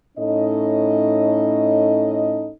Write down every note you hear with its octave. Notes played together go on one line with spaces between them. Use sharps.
A2 C#4 D#4 A4 D#5